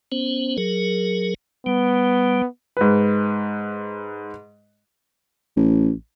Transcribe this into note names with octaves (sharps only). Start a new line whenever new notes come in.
B3 C#4 C5
F#3 G#4 A#4
G3 B3
G#2 B4
A1